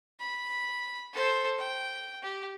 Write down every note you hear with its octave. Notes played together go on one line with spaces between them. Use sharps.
B5
A4 C5
G5
G4